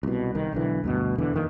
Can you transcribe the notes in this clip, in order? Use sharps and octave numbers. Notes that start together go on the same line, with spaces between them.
C2 B2
C2 D#3
B1 D3 E3
D2 G2 B2
E1 E2 D3 E3
F2 D#3 A#3